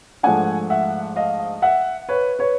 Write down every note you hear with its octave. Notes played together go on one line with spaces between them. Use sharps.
G#2 F3 A3 D4 F#5 G#5
E5 F#5
D#5 F5
E5 F#5
B4 C#5
B4 C#5